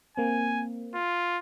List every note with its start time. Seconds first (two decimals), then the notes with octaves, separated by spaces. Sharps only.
0.17 A#3 C4 G#5
0.95 F4